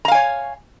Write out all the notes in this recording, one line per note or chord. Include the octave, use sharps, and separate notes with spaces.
C#5 F5 G#5 A#5